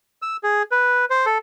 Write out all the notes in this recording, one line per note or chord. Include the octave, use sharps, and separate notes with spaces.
E6
G#4
B4
C5
A4